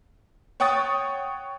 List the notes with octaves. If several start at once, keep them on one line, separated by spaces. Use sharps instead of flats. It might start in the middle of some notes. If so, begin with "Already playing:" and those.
C#5 F#5 G5 C#6 D#6 A6